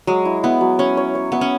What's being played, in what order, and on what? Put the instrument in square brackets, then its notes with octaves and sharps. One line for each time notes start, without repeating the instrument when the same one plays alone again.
[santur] F#3 [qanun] G#3
[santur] E4
[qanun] B3 [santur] E4
[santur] F#3
[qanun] C#4 [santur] C#5
[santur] C#5
C#5
[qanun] B3 [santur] E5
[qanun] C#4